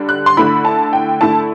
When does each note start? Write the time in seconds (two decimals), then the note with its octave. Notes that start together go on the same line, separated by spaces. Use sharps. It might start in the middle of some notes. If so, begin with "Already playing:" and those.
Already playing: D3 G3 D4
0.09 F#6
0.26 C6
0.37 D3 A3 E4 B5
0.65 A5
0.93 G5
1.21 D3 A3 E4 A5